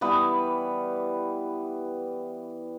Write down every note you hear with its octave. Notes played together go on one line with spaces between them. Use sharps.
E3 G3 B3 B4